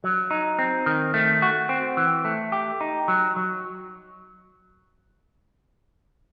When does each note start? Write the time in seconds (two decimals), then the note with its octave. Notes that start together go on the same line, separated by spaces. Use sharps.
0.04 F#3
0.31 D#4
0.59 C4
0.86 D#3
1.14 A3
1.42 F#4
1.69 C4
1.97 E3
2.25 A3
2.52 G4
2.81 D#4
3.08 F#3
3.36 F#3